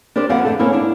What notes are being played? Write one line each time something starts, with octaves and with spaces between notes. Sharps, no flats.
D4 G4 A#4 C5 D5
F2 D3 A#3 B3 F5 F#5
D3 A3 A4
A#3 C4 C#4 E4
A#3 D4 E4